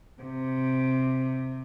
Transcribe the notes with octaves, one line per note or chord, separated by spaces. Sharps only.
C3